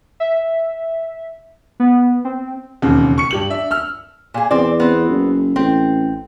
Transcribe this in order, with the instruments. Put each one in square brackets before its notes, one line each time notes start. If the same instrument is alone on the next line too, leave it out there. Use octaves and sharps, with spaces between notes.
[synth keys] E5
B3
C4
[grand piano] E1 D#2 C#3 C4
C#6 C#7
G2 G4 F#7
D4 E5
E6 F6
[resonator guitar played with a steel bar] A#2 G#4
[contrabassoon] E2 [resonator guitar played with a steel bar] C4 D5
[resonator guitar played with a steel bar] B3 C4
[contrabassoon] F#1
[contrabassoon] A1 [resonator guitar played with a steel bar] C4